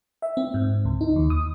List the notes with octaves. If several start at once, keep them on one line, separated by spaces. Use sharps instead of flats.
E5
C4
G#2
C#2
D#4
D#2
D#6